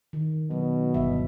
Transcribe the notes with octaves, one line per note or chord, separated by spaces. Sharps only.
D#3
B2 F#3
G1 E5